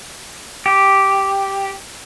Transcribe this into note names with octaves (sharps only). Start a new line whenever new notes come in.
G4